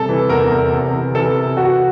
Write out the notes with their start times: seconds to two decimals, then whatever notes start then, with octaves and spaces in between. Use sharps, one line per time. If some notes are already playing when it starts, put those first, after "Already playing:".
Already playing: C3 G3 A4
0.09 E3
0.29 E2 A#4
0.51 E2
0.73 C3
0.93 E3
1.15 E3 A4
1.36 C3
1.57 E3 F#4